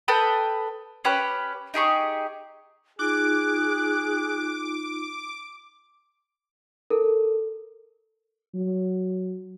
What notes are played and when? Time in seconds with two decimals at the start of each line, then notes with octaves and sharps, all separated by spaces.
0.08 A4 B4 G5 D#6
1.05 C#4 G4 B4
1.74 D#4 G4 G#4 C#6
2.99 D#4 F4 G#4 D6 F#6
6.90 A4 A#4
8.55 F#3